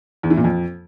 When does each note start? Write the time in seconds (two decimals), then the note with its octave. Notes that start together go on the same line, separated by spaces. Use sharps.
0.23 E2
0.30 E3
0.37 A#2
0.44 F2